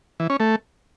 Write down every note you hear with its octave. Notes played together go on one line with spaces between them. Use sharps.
E3
C#4
A3